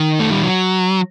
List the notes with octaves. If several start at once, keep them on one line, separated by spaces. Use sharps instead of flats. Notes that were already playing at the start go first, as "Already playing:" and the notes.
Already playing: D#3
A3
G3
F#3